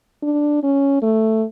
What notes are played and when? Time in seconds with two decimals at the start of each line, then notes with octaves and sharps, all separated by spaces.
0.23 D4
0.63 C#4
1.02 A3